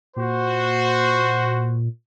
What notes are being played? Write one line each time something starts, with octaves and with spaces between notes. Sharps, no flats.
A#2 F#4 C5